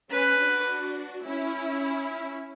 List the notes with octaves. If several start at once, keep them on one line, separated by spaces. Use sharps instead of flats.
C#4 B4
D4 F#4
C#4 E4